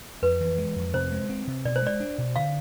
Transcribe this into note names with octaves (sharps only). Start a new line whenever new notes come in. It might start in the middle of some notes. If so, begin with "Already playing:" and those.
F2 B4
E3
G#3
F2
C3 C5
G#3
C4
C3
B2 D5
C5
G#3 D5
D4
B2
D3 F5